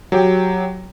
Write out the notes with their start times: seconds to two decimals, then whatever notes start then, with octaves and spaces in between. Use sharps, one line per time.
0.12 F#3 G4 G5